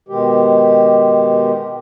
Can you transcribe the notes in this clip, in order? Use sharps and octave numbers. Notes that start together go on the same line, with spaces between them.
B2 D#3 G#3 G4